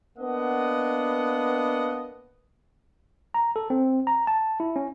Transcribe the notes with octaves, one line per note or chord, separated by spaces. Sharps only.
A#3 B3 D4 D#5 F#5
A#5
A4
C4
A#5
A5
E4
C#4